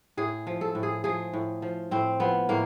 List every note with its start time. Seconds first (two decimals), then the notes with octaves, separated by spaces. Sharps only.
0.17 A2 G#4
0.47 F3
0.61 A4
0.75 A2
0.83 G#4
1.04 F3 G#4
1.33 A2
1.62 F3
1.91 A2 C4
2.20 F3 B3
2.49 A2 A#3